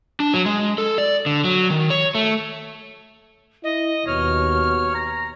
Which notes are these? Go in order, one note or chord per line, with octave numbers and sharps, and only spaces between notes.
D4
F#3
G#3
A4
D5
D3
F#3
D#3
C#5
A3
E4 D#5
D#2 B2 C#5 F6
A#5